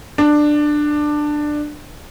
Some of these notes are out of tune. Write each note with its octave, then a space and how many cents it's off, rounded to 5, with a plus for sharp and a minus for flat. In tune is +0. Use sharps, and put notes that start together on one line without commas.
D4 +15